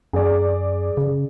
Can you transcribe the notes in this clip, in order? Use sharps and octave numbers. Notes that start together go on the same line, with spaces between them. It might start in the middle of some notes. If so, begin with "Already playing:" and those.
F#2 G#4 D5
C#3